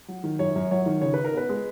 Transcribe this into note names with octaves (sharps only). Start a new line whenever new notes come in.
F#3
D#3
F#2 C#5
F#2
F#3 C#5
D#3
C#3 C#5
D#4 B4
A#4
B3 B4
G#3